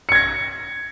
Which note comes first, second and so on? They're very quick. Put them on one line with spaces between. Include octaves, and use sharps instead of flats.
C#7 G#6 A#6